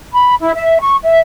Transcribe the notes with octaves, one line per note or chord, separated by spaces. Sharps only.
B5
E4
E5
C#6
E5